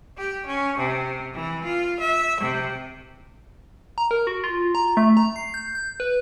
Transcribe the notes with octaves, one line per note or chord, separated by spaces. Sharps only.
G4
C#4
C3
E3
F4
E5
C3
A#5
A#4
F#4
F4
A#5
A3
A#5
C7
G6
G6
B4